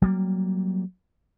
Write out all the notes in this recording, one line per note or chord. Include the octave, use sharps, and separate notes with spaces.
F#3 G3 A#3